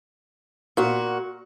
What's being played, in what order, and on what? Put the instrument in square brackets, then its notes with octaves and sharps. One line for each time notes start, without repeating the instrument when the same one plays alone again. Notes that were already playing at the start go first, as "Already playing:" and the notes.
[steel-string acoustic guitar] A#2 F#4